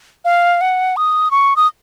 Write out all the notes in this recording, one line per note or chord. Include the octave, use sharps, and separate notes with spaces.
F5
F#5
D#6
C#6
D#6